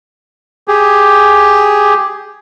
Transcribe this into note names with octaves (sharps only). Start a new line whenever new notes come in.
G4 G#4